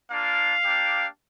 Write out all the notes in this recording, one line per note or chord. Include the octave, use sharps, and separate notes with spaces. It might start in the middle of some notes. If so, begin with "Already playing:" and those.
A#3 D4 F4 F5
A#3 D4 G4